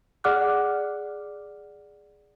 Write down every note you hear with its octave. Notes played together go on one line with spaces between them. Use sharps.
G#4 D5 F#5 D6 F6 F#6